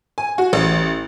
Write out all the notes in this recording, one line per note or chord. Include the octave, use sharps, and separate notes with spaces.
G#5
F#4
A1